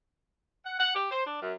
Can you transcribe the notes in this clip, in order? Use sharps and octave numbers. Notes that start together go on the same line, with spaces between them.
F#5
F#5
G4
C5
D4
F#2